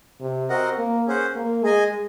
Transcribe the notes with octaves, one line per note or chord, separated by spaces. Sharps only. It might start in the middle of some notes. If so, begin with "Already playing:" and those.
C3
C4 F#4 A#4 D#5 F#5
A#3
C#4 G#4 C5 F#5
A#3
G#3 G#4 D#5 G#5